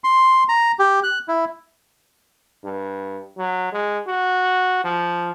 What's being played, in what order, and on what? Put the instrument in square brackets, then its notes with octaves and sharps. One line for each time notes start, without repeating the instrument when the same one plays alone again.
[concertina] C6
A#5
G4
F#6
E4
[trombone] G2
F#3
G#3
F#4
F3